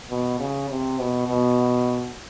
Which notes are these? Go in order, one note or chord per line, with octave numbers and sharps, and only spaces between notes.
B2
C#3
C3
B2
B2